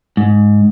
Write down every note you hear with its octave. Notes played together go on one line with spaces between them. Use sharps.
G#2